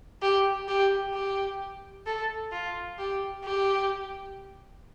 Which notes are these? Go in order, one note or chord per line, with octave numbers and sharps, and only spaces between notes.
G4
G4
G4
A4
F4
G4
G4